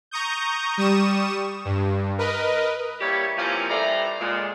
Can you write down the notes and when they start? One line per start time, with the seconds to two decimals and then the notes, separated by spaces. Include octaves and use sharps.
0.11 A#5 C#6 D#6 G6
0.77 G3 C#6 D#6 E7
1.65 G2
2.18 A#4 B4 D#5
3.01 G3 A#3 E4 G4 C#5
3.36 C3 E3 F3 A#3 C4 C#4
3.70 E3 G3 A3 C5 D5 A#5
4.20 A#2 G#3